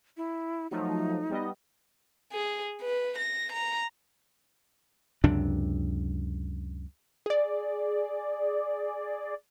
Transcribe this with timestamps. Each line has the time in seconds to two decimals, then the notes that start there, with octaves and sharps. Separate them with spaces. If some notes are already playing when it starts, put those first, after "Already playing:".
0.17 E4
0.71 F3 F#3 A3 D#4
1.30 G3 B3 D#5
2.32 G#4
2.82 B4
3.18 A#6
3.52 A#5
5.24 C#2 F#2 C3 D4
7.26 G#4 D5